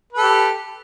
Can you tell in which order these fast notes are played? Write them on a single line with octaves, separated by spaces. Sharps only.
B4 A4 G4